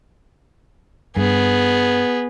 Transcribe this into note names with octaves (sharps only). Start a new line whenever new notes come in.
G2 B3 G#4